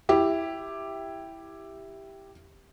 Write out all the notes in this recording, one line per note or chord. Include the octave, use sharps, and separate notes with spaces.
E4 G4